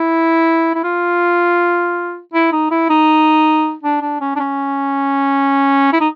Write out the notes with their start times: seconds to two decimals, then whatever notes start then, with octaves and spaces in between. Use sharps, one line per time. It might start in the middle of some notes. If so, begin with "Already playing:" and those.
Already playing: E4
0.75 E4
0.84 F4
2.34 E4
2.52 D#4
2.71 E4
2.90 D#4
3.83 D4
4.02 D4
4.21 C#4
4.36 D4
4.40 C#4
5.93 E4
6.00 D#4